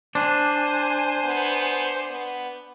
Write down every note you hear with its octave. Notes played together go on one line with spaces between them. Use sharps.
D4 C5 G#5
B3
B3